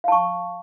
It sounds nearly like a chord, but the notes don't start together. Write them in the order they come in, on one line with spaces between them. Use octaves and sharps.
F5 A5 C#6